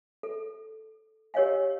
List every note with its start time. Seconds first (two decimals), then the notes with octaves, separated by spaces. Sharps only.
0.23 A4
1.34 G4 A#4 C#5 D#5 F5 G#5